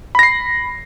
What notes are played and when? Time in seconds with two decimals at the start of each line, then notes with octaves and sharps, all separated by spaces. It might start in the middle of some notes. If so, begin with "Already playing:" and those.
0.15 B5
0.19 A#6
0.23 C7